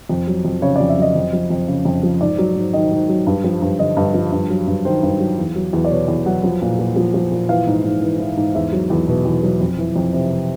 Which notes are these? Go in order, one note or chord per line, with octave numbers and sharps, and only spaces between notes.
F2
F#3
F2
C#3 C#5
D5
F2
E5
F#3 D#5
F2
F3
F2
C#3
F2
F3
G#2 D5
F#3
G#2
D#3 D#5
G#2
F#3
G2
F3
G2
D3 D#5
G2
F3
G2
F#3
G2
D#3 C5
G2
F#3
E2
F#3
E2
D5
B2 C#5
E2
F#3 F#5
F3
A#2
A#2
F3
F3
A#2
E3 F5
G#2
G#2
E3
E3
G#2
E2 E5
F#3
E2
B2
E2
F#3
F2
E3
F2
C3